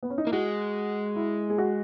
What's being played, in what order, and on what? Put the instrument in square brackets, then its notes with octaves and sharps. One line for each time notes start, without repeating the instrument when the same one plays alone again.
[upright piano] B3
C#4
D#4
[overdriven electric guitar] A#3 [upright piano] E4
[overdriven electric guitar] G#3 [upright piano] F#4
[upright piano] E4
G#4
F#4